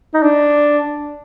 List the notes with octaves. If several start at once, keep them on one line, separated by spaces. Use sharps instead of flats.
D#4
D4